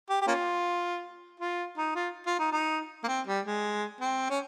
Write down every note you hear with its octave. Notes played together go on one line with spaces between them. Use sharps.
G4
G4
A#3 C#4 F4
F4
D#4
F4
F4
D#4
D#4
A#3
C4
G3
G#3
C4
C#4